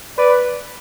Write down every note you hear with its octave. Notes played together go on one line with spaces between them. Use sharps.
B4 D5